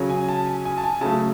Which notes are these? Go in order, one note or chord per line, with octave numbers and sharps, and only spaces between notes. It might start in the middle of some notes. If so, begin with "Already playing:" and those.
Already playing: C#3 F#3 C#4
G#5
A5
G#5
G#5
A5
G#5
C#3 F#3 A3 A5